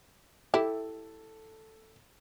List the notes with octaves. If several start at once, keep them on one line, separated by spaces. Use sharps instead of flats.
E4 G4 A4